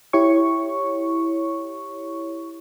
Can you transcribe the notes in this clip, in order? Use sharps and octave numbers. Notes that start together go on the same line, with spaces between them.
E4 G4 C#5 C#6